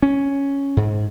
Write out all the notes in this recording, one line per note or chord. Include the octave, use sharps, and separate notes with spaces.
C#4
G#2